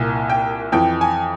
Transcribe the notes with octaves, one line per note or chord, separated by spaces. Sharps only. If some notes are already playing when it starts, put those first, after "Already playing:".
Already playing: C2 A#2
G5
F2 E3 G5
G#5